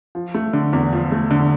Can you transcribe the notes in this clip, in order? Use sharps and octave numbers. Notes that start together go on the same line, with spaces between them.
F3
A3
D3
E2
F3
A3
D3